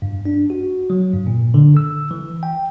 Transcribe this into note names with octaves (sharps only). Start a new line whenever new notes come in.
G2
D4
F#4
F#3
G2
A#2
D3
E6
E3
G5